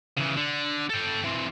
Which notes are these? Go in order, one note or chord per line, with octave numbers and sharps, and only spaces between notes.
C#3 E3
D3
A4 G5
E3 C4